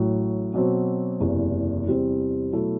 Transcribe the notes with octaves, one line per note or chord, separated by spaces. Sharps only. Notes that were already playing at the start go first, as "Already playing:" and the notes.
Already playing: A1 A2 F#3
B2 F#3 C4
F#1 E2 C3
E2 C3 G3 C4
B2 F#3 A3 E4